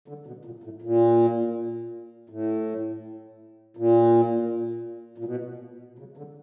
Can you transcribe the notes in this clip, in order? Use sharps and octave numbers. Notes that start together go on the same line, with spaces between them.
D3
B2
A#2
A2
A#2
A2
A#2
A#2
B2
C#3
D3